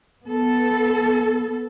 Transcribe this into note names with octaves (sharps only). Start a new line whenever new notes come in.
B3 A4